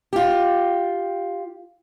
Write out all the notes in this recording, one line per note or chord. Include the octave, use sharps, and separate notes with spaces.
F4 G4